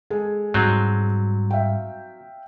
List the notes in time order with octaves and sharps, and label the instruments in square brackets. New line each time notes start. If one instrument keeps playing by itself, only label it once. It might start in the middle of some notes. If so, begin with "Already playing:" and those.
[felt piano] G#3 A4 G#5
[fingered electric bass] G#2 G3 [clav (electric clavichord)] F#3 C4 D#4
[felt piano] E5 F5 G5